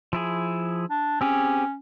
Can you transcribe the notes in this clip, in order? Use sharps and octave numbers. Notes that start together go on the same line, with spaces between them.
F3 E4 G#4
D4
C4 C#4 G4 G#4